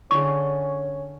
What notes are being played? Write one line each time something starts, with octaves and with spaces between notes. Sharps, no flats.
D3 C#4 G#4 C#6